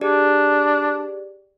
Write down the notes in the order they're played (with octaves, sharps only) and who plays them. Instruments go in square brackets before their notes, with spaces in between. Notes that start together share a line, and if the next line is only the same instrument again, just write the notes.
[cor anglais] D4 [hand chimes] G4 G#4 D5